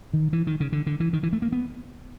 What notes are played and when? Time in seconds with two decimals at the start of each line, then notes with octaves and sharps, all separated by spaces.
0.14 D#3
0.33 E3
0.47 D#3
0.60 C#3
0.72 D3
0.87 D3
1.00 E3
1.13 D#3
1.23 E3
1.33 A3
1.42 A#3
1.52 B3